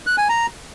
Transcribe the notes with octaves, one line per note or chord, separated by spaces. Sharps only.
F#6
G#5
A#5